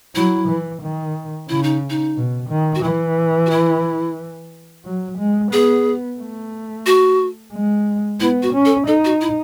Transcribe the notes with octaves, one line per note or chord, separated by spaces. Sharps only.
F#3 E4
E3
D#3
C#3 E4
D#4
D#4
B2
D#3
F#4
E3 E4
F#4
E4
F#3
G#3
B3 G#4
A3
F#4
G#3
B3 E4
F#4
C#4
A4
D#4 A4
F#4
E4